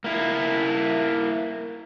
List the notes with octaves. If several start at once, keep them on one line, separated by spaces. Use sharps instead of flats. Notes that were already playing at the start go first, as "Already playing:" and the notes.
A#3 E4